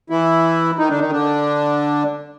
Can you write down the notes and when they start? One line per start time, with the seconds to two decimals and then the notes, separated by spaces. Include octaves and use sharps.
0.10 E3 E4
0.78 D#3 D#4
0.89 D3 D4
1.01 D#3 D#4
1.12 D3 D4